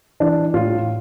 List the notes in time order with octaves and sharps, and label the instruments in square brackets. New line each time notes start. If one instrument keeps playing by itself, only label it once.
[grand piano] E3 D4
A2 F4